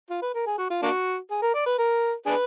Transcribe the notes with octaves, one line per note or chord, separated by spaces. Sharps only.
F4
B4
A#4
G#4
F#4
F4
A#3 D4 F#4
G#4
A#4
D5
B4
A#4
D4 G#4 B4